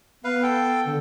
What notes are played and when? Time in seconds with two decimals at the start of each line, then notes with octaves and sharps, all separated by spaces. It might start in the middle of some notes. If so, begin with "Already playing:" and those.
0.24 B3 B4 F5
0.43 A4 G5
0.86 D3